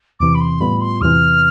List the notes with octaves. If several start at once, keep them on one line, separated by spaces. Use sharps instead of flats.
E2 C3 E3 D6
B5
C6
A2 G3 B3 F4 B5
C6
E2 C3 E3 F6